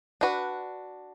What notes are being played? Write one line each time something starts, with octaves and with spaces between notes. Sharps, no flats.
D4 F#4 B4